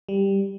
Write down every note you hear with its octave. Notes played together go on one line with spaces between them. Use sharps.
G3